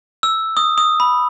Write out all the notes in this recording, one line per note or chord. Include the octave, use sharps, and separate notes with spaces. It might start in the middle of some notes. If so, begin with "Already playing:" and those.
E6
D#6
D#6
B5